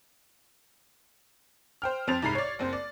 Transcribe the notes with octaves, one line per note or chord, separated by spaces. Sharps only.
C5 G5 F6
F2 C4 C5 A6 F7
C2 G#2 A#5 B5 C7
C#5 D5
F#1 C4 C5
D5